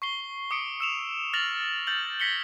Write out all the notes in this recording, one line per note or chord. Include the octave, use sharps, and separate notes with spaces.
C#6 C7 G7
D6 D#6 C#7 D7
E6 E7 F7
F6 A6 A#6 F7 F#7
F6 G6 A6 F#7
G#6 A#6 B6 C#7 G7